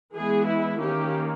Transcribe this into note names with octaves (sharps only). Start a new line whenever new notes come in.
E3 G#3 B3 G#4
E4
D#3 A#3 C#4 G4